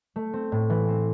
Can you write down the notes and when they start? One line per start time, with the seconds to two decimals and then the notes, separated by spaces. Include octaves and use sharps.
0.16 A3
0.33 C4
0.52 A2
0.70 E3
0.88 C4